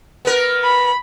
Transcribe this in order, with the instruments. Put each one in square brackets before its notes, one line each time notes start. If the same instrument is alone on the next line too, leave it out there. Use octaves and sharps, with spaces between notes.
[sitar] B3 A#4
[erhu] B5